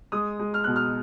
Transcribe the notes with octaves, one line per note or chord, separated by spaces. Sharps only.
G#3 D#6
G#3
F6
B2 F#6
F6